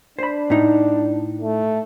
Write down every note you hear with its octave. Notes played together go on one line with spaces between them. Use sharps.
D4 C5 B5
A2 D#4
A3